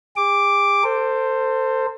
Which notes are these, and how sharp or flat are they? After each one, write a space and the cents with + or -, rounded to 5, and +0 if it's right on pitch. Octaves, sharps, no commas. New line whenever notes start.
G#4 -45 D6 +0
A4 +35 C5 +0